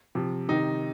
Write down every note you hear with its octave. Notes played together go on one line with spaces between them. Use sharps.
C3 F3
C3 D#3 D#4